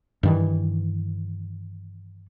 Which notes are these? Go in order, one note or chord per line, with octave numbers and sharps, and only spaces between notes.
G2 D#3 E3